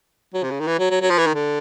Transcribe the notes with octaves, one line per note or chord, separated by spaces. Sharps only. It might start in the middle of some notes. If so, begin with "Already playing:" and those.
F#3
C3
C#3
D#3
E3
F#3
F#3
F#3
F3
E3
D#3
D3